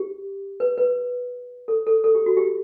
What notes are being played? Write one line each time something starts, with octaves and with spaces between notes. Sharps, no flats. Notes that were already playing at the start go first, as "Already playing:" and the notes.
Already playing: G4
B4
B4
A4
A4
A4
G4
F#4
G4